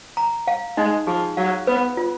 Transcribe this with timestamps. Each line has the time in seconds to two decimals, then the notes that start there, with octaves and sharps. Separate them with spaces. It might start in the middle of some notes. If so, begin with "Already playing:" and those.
0.17 A#5
0.48 F5
0.77 G#3 D#4
1.07 F3 G#4
1.37 F#3 F5
1.67 B3 B4
1.97 F4